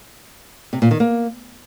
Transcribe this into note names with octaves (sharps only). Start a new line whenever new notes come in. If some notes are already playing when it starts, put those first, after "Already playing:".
C3
A#2
D#3
A#3